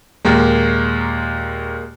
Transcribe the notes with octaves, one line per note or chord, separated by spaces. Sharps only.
D#2 A#2 G#3 A#3